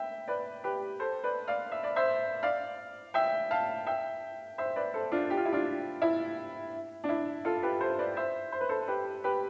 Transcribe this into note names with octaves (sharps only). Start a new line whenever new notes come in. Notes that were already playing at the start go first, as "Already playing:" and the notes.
Already playing: E5 G5
B4 D5
G4 B4
A4 C5
B4 D5
D5 F5
E5
D5
C5 E5
D5 F5
E5 G5
F5 A5
E5 G5
C5 E5
B4 D5
A4 C5
D4 F4
G4
F4
E4
D4 F4
E4
D4
E4
F4 A4
G4 B4
A4 C5
B4 D5
C5 E5
C5
B4
A4 C5
G4 B4
G4 B4